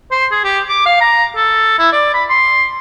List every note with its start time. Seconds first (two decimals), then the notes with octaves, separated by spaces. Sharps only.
0.11 C5
0.31 G#4
0.44 G4
0.69 D6
0.86 F5
1.01 A#5
1.37 A4
1.79 E4
1.93 D5
2.14 B5
2.30 C6